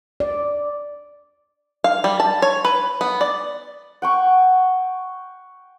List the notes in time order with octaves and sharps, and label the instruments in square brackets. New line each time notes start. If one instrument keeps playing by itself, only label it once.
[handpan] D5
[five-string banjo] F5
G3
A5
C#5
B4
B3
D5
[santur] F#5 G5 C#6